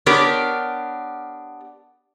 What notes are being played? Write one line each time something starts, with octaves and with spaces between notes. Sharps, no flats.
B3 D4 G4 A#4 C#5